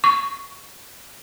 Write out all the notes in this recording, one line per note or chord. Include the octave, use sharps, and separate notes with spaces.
C#6